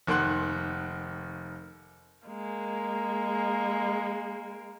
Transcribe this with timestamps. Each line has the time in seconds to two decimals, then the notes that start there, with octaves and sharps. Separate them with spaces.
0.07 F1 D#3 A#3 F#5 C6 F#6
2.26 G#3 A#3